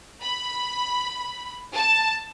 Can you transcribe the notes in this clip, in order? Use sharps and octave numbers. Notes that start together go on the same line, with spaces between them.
B5
A5